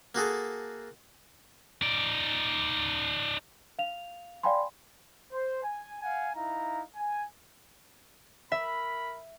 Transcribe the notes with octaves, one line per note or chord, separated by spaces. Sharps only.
A#3 F#4 G#4 A4
D#4 D5
F5 F7
D5 F5 G5 G#5 B5 C6
C5
G#5
F5 F#5 G#5
D#4 E4 F5 A#5
G#5
A#4 E5 B5